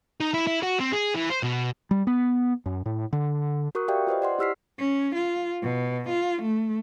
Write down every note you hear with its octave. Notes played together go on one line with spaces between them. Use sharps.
D#4
E4
E4
F#4
C4
G#4
E3
C5
B2
G3
B3
F#2
A2
D3
F#4 A#4 C#6 D#6 F#6
G4 D5 E5 F5 G5
F4 B4 C5 D#5
D5 F#5 C6
E4 G4 E6 F6 B6 C7
C#4
F4
B2
F4
A3